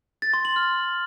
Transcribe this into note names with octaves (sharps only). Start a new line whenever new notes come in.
A6
C6
F#7
F6